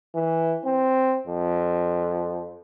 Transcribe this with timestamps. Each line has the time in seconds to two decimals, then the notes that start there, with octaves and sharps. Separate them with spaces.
0.15 E3
0.65 C4
1.27 F2